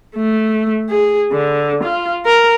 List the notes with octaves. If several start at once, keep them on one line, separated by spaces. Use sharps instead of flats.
A3
G#4
D3
F4
A#4